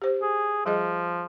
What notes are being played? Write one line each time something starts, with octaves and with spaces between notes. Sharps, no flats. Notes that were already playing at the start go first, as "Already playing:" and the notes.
G4 C5
G#4
F3 G3 G#4 D#5